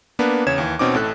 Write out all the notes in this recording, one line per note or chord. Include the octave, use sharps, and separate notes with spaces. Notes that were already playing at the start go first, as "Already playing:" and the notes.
A#3 B3 D4 B4
E2 C#3 C#5 G#6 E7
D#2 E3
B2 C4 C#4 D#4 D6
A1 A2 A4 F#6